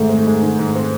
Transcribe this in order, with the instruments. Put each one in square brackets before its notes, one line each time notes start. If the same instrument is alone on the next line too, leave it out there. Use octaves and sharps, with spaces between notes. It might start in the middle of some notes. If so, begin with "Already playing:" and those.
Already playing: [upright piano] G#2 D#3 G#3 [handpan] A3
[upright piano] C4
G#3
D#3
G#2
C4